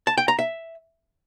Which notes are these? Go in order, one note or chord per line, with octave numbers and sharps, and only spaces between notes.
A5
G5
A#5
E5